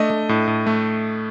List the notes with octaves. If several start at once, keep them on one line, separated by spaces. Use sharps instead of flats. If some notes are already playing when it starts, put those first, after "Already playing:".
Already playing: A3 D4 D#5
A3
A2
A2
A3